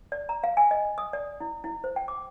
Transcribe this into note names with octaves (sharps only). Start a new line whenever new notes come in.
D5
A#5
F5
G#5
D#5
D#6
D5
E4
E4
C5
G5
D6